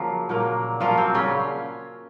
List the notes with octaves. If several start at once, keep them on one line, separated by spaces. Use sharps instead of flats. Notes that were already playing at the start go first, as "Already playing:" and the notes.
Already playing: C#3 F3 F#3 A#3 F4
A#2 F#3 A#3
A#2 F3 F#3 A#3 F4
C4
C#3 C#4